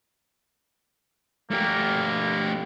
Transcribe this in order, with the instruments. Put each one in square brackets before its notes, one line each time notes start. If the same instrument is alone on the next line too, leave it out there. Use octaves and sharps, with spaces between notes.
[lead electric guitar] A3 G4 [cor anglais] A#3